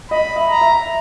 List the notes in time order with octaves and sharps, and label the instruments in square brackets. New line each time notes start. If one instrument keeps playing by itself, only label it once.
[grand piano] D#5 [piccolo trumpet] B5
[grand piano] E5
[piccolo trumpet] A#5
[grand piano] E5